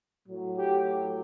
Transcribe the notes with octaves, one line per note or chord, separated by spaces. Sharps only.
A2 F#3
G4